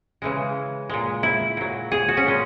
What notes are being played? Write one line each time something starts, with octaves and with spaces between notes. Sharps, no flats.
C#3 E3 G#3
A#2 G#3
E4
A#2 F#3
G#4
F#4
C#4
A#2 G#3